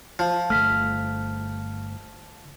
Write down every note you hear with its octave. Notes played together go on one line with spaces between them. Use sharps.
F3
G1 D#2 A3 F6 B6